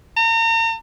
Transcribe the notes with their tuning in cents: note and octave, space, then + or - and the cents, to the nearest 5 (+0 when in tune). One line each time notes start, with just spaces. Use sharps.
A#5 -40